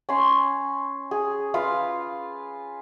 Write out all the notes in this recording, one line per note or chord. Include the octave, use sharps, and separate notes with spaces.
C#4 C6
G#4
F4 B4 F5